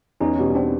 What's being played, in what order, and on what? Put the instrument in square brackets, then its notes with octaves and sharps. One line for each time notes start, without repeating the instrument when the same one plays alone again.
[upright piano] E2 [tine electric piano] C#4 D#4
[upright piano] B2 G3
[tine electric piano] C4 D4